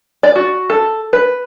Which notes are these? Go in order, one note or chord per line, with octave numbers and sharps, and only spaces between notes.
D5
F#4
A4
B4